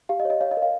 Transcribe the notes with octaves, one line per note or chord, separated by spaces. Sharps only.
G4 F5
D#5
C#5
D#5
C#5 F5
D#5
A#4
F5